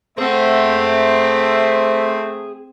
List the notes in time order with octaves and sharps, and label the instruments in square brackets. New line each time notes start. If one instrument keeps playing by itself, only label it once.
[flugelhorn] A3 [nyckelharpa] C4 [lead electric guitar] G#4 F#5 [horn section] C5 E5